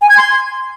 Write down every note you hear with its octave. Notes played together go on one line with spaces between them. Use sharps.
G#5
G#6
C6